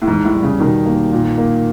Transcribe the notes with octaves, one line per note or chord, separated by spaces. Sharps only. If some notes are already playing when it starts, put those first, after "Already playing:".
A2
E2 G#2
A2
G3
C#3
B2 D#3
A#3
A#2
A#3